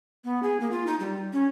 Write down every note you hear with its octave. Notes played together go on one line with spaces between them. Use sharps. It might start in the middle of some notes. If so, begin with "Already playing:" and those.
B3
G#4
A#3
F4
D#4
G3
C#4